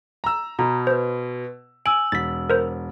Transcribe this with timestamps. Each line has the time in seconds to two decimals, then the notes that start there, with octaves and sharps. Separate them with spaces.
0.24 A#5 E6
0.59 B2 A#5
0.87 B4 C5 C6
1.86 G#5 E6 D7 F#7
2.12 E1 A6 B6
2.50 A#4 C5